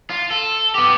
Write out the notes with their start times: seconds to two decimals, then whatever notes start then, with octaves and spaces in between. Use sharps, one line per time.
0.10 F4
0.31 A4
0.75 B3 G4